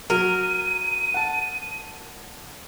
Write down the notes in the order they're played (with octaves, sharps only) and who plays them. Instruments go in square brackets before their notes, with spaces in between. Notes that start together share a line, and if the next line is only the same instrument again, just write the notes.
[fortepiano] F#3 [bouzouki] A#4 [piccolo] D#7
[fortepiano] F#5 A5